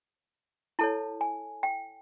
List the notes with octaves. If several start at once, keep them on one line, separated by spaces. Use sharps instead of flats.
E4 A4 C#5 A5
G#5
G5